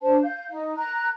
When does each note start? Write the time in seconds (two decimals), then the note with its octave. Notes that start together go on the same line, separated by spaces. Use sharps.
0.01 D4 C5 A5
0.23 F5 G6
0.49 D#4
0.77 A#5 F#6